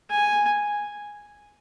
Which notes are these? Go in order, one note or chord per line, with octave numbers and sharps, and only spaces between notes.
G#5